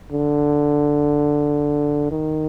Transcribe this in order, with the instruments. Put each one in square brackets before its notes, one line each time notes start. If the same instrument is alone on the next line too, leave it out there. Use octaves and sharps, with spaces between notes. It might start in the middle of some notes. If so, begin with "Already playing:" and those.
[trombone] D3
D#3